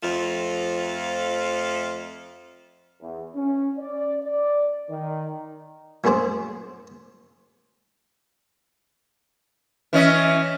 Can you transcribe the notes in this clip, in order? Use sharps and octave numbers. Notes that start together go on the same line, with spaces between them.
F2 F3 A3 F4
E2
C#4
D5
D5
D#3
A#1 F#2 A2 G#4 C5 D6
E3 C#4 D#5